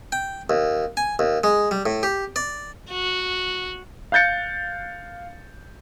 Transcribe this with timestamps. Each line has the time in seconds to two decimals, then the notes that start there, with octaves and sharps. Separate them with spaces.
0.12 G5
0.50 D#2
0.97 G#5
1.19 D#2
1.44 G#3
1.71 G3
1.86 A2
2.03 G4
2.36 D5
2.90 F#4
4.12 F5 F#6 G6 A6 C#7